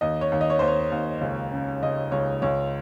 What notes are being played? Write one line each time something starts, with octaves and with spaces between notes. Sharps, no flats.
D#2 D#5
C#5
D#2
D#5
C#5
D#2 C5
C#5
D#2
C#2
C#3
C#2 D#5
C#2 C#5
C#2 C#5